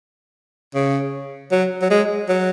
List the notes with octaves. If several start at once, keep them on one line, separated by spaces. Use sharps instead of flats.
C#3
F#3
F#3
G#3
F#3